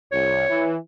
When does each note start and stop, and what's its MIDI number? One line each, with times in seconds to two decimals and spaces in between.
0.12 0.48 36
0.12 0.70 73
0.49 0.76 52